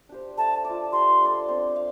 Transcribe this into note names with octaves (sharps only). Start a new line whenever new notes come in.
D4 G4 C5
A3 A5
D5
F4
G3 C6
D4 A4 D5
C4
F5